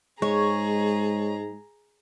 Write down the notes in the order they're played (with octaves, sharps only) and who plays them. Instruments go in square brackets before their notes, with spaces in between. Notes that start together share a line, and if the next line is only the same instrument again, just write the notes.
[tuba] G#2 [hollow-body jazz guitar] G#3 [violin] G#4 A#5 [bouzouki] C#5